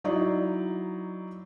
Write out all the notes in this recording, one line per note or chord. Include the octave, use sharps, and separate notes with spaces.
F#3 D#4 E4 D5